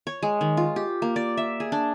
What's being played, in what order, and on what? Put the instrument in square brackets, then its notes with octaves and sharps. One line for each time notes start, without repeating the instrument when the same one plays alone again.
[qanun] C#5
G#3
D#3
F4
G4
A#3
D5
E5
G#4
D4